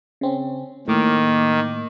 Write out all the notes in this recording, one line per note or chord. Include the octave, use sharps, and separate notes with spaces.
C#3 C4 C#4
A2 D#3 A#3 D6 F6